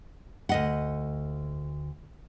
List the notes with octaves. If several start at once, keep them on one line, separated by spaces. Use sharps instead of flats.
D2 D#5 F#5